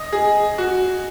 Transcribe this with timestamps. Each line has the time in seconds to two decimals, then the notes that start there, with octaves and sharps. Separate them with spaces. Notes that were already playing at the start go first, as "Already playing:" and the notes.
Already playing: D#5
0.12 G#4
0.58 F#4